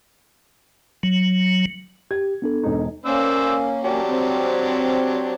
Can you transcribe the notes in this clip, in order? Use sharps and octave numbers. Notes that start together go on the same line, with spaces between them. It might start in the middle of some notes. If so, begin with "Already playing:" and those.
F#3
G4 G#6
B3 D4 A4
E1 D#4
A#3 C#4 C5 D5 E6
F#3 D4 G4
C4